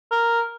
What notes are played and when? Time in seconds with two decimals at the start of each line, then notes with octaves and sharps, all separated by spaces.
0.11 A#4